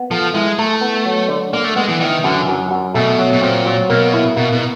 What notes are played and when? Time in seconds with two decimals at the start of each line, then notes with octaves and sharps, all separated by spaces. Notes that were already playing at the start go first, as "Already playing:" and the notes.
Already playing: B3
0.11 F3 A4
0.34 G#3 E4
0.58 A3 A4
0.81 B3
1.06 F#3
1.29 D3
1.53 D3 A#3
1.65 A3
1.76 G#3 B3
1.88 E3
2.01 D#3 E3
2.24 F#2 D3
2.48 F#2
2.71 F#2
2.94 B2 A3
3.19 F#3
3.33 B2
3.42 A#2 C4
3.66 F#3
3.90 B2 A#3
4.14 E4
4.36 B2 A#3
4.53 B2